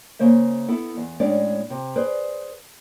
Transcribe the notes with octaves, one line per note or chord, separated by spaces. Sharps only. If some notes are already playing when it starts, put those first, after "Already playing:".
C#3 A#3 C5 E5
B3 E4 A4
E2
A2 G#3 C#4 D4 D5
C3
G#4 B4 C5 D5